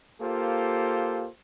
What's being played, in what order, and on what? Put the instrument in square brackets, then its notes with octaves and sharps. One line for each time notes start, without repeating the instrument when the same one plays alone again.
[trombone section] A#3 F4 G4 A4 C5